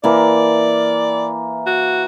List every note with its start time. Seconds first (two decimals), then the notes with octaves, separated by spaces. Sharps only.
0.04 E3 A#3 D5
1.66 F#4